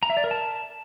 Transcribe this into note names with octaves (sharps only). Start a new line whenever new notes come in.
A#5
E5
D5
A#4
A5